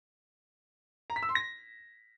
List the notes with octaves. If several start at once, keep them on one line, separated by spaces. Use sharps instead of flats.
A#5
B6
E6
C6
A#6